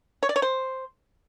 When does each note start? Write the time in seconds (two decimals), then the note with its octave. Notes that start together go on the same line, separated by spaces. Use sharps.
0.23 C#5
0.29 D5
0.36 C#5
0.42 C5